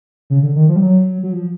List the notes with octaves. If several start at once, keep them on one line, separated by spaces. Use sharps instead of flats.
C#3
D3
D#3
F3
G3
F#3
F#3
F3